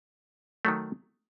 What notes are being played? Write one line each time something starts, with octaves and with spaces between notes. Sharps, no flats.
D#3 F#3 A3